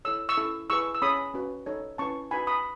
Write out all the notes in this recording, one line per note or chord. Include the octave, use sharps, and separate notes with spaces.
E4 A4 C#5 E6
C#6 E6
C#4 E4 A4
E4 G#4 B4 C#6 E6
E6
C#4 G#4 C#5 B5 D#6
C#4 F#4 B4
D#4 A4 C#5
C#4 E4 B4 A5 C#6
D#4 F#4 B4 G#5 B5
B5 D#6